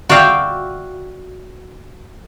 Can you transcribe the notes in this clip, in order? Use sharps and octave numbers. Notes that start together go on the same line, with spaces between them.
F#4 D5 E5 F5 G5